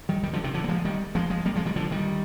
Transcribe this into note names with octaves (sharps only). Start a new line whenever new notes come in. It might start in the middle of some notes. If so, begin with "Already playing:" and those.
D#3 G3
D#3 G3
D3 F3
C3 D#3
D3 F3
A#3
F3 G#3
D#3 G3
F3 G#3
F3 G#3
G3 A#3
F3 G#3
D#3 G3
D3 F3
D#3 G3